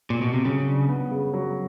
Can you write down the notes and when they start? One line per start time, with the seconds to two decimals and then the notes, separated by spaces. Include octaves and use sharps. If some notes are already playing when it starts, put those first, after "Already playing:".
0.10 A#2
0.21 B2
0.34 C3
0.45 C#3 F#3
0.67 D4
0.88 B3
1.11 C#3
1.33 F#3